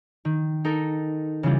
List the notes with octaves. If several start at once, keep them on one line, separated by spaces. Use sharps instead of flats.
D#3
D#4 A4 A#4
C#3 E3 G3 F4